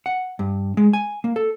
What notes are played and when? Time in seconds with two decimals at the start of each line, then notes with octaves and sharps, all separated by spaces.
0.06 F#5
0.39 G2
0.77 G#3
0.93 G#5
1.24 A#3
1.36 A4